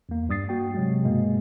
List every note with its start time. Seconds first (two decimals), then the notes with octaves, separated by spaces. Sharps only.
0.09 E2 A#3
0.29 G2 G3 D#6 A6 C7
0.49 A#3 F#4 G5
0.75 C3 F#3 G#3
1.03 G2 B2 G#3 A#3